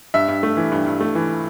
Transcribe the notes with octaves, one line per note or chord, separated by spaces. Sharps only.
G2 E5
G2
A3
E3
G2
G2
A3
E3